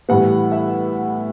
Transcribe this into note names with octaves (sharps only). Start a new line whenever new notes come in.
A2 E3 G3 B3 F#5
E5